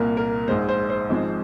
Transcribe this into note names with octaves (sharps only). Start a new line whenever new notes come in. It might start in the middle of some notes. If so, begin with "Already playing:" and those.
Already playing: C2 A#2 A#3 A#4
A#4
A#1 G#2 G#3 C5
C5
C5
G#1 G#2 F3 G#3 C4